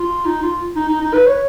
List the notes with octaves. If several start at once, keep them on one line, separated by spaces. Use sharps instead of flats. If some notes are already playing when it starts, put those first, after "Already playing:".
Already playing: F4
D#4
F4
D#4
D#4
D#4
B4
C#5